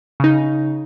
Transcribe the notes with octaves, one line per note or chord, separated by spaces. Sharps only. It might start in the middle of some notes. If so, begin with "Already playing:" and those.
C#3 D#4